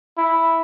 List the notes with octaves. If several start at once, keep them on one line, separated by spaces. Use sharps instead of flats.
E4